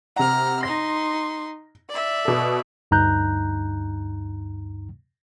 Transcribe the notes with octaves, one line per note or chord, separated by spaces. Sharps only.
C3 F#5 A#5 F6
D#4 C6 A#6
D5 E5
B2 A4
D2 G2 D#4 A#5 F#6 G6